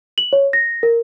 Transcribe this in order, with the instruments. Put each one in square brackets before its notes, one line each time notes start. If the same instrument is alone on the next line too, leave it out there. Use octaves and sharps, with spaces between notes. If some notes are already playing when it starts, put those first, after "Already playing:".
[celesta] F#7
C#5
A#6
A#4